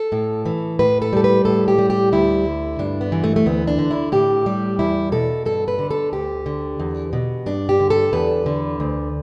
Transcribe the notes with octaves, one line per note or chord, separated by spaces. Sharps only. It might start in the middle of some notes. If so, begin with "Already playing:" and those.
Already playing: A4
A2
E3
A2 B4
A4
G3 A4
B4
A2 A4
G4
G3
G4
D2 E4
D3
G2 D4
B3
E3
A3
A3
D2 B3
D4
D3
E4
A2 G4
G3
E2 E4
B2 A4
G2 A4
B4
D3
A4
D2 G4
D3
E2
B2
G2 D4
G4
D3
A4
E2 B4
D3
D2